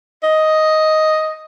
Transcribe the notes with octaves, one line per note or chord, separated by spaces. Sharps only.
D#5